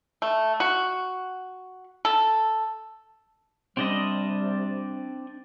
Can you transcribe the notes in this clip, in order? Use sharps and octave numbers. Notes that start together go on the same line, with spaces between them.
A3
F#4
A4
C3 G3 C4 D4 D#5